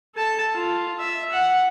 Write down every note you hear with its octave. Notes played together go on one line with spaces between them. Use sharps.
A4 A5
F4
E5
F#5